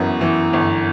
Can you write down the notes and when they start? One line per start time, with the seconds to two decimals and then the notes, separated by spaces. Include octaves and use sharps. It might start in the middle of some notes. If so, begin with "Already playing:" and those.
Already playing: G1 F#2 E3 B3
0.21 E3
0.53 G1